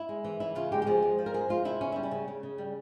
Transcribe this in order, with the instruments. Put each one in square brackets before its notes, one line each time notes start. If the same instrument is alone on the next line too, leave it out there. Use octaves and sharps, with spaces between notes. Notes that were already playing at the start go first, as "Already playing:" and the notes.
Already playing: [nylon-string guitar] E4
G#3
E3
E3 E4
C#3 F4
G#3 G4
G4
F3 G#4
G#3
F3
A#4
G#3 G#4
G#3 F4
C3 E4
C#3 C#4
G3 E4
C#4
C#3
C#3
C#3
G3